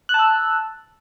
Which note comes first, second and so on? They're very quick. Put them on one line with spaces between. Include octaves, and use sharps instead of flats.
F#6 A5 E6